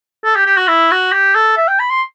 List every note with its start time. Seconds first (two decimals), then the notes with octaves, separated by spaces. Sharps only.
0.24 A4
0.35 G4
0.46 G4
0.57 F#4
0.68 E4
0.91 F#4
1.12 G4
1.35 A4
1.57 E5
1.68 G5
1.79 B5
1.90 C6